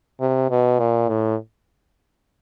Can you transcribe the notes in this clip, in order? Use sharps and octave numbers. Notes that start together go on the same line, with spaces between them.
C3
B2
A#2
A2